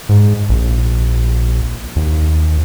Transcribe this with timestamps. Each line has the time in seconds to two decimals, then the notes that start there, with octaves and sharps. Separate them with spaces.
0.09 G#2
0.49 A#1
1.96 D#2